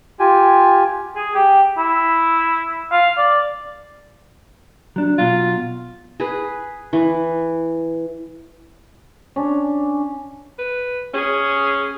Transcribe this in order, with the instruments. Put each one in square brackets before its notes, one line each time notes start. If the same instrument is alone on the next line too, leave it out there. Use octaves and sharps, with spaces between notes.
[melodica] F4 G4 G#5
[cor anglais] G#4
G4
E4
F5
D5
[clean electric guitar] F#3 D4
[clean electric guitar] B2 F#3 [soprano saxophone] F4
[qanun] G#4 B4
E3
[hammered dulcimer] C#4 D4
[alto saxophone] B4
[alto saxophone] C#4 [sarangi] G#4